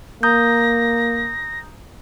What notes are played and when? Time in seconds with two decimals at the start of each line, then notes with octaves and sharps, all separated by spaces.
0.23 A#3 A#5 D#6 G6 A#6